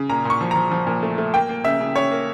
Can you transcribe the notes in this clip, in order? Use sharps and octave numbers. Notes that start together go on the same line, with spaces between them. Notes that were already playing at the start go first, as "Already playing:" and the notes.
Already playing: C#3
A#2 A#5
A#2 C#6
F3
F3 A#5
F3
A#2
A3
A3
A#3 G5
A#3
C#3 E5
C#3
C#3 C#5
A#3